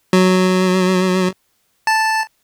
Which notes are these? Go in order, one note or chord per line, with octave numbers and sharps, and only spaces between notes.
F#3
A5